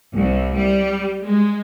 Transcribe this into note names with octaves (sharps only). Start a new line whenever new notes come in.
C2
G3
G#3